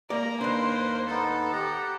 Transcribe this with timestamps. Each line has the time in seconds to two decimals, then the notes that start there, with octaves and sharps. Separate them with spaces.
0.10 A#3 D5 A#5
0.41 D#2 D4 B4 C5
1.10 B3 D#4 A4
1.53 G4 F#5 A#5